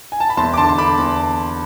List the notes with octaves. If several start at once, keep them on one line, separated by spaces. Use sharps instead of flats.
G#5
A5
B5
E2 A5 C6
D6
D3 A5 C6
C6
D3 B5 D6
E2